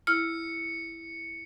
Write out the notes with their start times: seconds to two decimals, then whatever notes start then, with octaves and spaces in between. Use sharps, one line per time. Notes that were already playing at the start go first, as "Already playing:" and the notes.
0.07 E4 F6 C#7